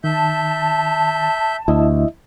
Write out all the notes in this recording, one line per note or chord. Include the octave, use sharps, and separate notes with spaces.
D#3 E5 A5 G6
D2 E4 D#5 E5